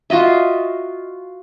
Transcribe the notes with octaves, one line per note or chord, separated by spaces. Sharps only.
F4 F#4 D#5 E5